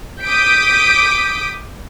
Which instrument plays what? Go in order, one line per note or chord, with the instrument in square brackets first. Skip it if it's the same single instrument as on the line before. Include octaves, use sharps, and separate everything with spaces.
[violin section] D6 D#6 G6 B6 D7